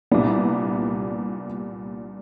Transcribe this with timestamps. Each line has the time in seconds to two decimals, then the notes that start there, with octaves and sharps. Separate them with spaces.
0.11 C2 A#2 G3 B3 D4